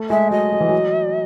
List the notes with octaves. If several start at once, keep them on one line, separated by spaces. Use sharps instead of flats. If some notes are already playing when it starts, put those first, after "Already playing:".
Already playing: A3
G#3 E5
F#3 D#5
F#3
E3
F#3